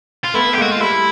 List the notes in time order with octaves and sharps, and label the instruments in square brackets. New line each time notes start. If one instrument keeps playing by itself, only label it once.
[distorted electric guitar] F4
[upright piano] A3 B3 [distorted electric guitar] E4
[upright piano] B3
[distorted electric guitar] G4
[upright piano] G#3 A#3 [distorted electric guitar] F#4
[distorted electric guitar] F4
[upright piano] G3 A3 [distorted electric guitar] E4